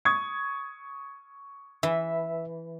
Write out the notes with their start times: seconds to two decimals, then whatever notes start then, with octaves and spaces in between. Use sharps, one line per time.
0.05 C#6 D#6 G#6
1.83 E3 E5